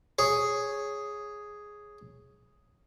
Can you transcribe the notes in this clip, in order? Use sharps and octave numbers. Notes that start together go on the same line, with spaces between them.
G#4 C#5